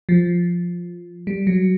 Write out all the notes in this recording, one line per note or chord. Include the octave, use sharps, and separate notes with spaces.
F3
G3
F#3